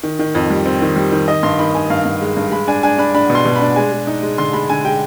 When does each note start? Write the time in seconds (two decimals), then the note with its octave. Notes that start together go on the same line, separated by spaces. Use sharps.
0.03 D#3
0.19 D#3
0.35 F2
0.50 G3
0.66 C4
0.82 D#3
0.96 G3
1.12 D#3
1.28 D#3 D#5
1.43 G2 C6
1.59 D#3 B5
1.74 D#3 G#5
1.90 G2 F5
2.05 G2
2.21 G#3
2.36 G2
2.52 G#3 B5
2.68 D4 G#5
2.83 D4 G#5
2.98 D4 B5
3.14 D4 B5
3.30 B2
3.35 C6
3.45 B2
3.56 D4 B5
3.76 G#3 G#5
3.92 G#3
4.07 D#4
4.23 G#3
4.38 D3 C6
4.53 G#3 B5
4.69 D3 G#5
4.85 G#3 G5